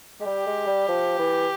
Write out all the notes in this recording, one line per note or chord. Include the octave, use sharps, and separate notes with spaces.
G#3
G3 G4
G#3
G3
F3
E3